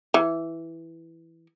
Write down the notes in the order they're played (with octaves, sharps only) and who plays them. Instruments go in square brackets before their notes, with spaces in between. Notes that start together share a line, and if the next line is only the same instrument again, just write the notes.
[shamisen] E3